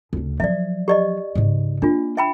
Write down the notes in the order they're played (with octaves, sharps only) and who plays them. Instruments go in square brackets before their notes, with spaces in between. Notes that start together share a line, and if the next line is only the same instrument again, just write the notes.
[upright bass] D2 C#3
[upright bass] F3 F#3 [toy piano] D5 E5
[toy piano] G4 D5 D#5
[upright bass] G#2 C#3
[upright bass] A#3 [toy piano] D4 F4
[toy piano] E5 G5 B5